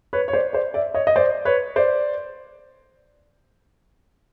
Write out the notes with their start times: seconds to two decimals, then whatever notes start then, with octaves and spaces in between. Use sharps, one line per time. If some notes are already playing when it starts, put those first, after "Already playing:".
0.13 B4 C#5
0.28 C#5
0.33 C5 D5
0.53 C5 D5
0.74 D5 E5
0.94 C#5 D#5
1.07 D#5
1.16 C5 D5
1.45 B4 C#5
1.76 C5 D5